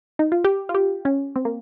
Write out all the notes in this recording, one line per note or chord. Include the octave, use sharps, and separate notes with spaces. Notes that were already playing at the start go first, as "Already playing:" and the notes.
D#4
F4
G4
F4
G4
C#4
C4
A#3